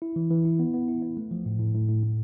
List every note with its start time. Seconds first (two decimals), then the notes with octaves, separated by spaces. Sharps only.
0.02 E4
0.16 E3
0.30 E3
0.45 E4
0.59 B3
0.74 B3
0.88 E4
1.02 B3
1.17 A3
1.31 F3
1.46 A2
1.60 A2
1.75 A2
1.89 A2
2.03 A2